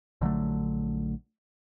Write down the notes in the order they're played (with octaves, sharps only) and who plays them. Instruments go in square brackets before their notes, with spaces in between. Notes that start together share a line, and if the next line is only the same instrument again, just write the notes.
[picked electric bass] A#1 D3 F#3 A3